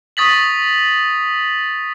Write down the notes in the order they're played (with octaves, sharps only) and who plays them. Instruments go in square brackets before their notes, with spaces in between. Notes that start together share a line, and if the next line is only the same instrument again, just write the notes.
[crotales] C#6 D#6 A6 B6 F#7